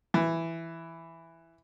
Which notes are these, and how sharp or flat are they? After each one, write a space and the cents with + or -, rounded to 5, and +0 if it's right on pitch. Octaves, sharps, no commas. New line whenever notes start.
E3 +5